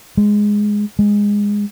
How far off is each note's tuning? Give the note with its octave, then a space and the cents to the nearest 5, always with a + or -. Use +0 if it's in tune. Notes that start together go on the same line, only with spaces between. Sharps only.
G#3 +0
G#3 -15